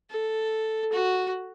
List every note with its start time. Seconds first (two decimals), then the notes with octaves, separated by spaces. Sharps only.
0.10 A4
0.92 F#4